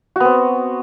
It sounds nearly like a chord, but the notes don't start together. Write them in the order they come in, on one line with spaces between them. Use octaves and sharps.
F#4 B3 C4